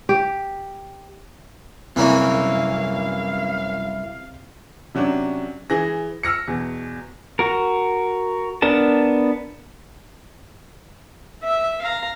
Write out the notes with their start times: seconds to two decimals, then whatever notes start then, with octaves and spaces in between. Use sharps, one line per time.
0.09 G4
1.96 C2 F#2 C3 E3 A#3 C#4 E4 F5
4.95 C3 F#3 C#4 D4
5.70 E3 G#4 A#6
6.23 E6 F6 A#6 C#7
6.48 E2 B2
7.39 F#4 A#4
8.62 B3 D4 A#4 A5
11.43 E5
11.82 F5 A#5